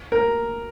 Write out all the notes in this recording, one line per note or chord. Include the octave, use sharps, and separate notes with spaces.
A#4